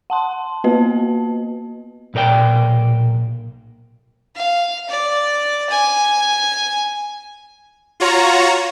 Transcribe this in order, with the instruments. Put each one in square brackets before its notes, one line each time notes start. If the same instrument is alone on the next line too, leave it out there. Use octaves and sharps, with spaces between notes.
[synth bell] F#5 A5 C6
A#3 B3 F#4 B4 D#5 A5
[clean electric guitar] B1 A#2 A#4 D5 G5
[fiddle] F5
D5
G#5
[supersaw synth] F4 F#4 C#5 A#5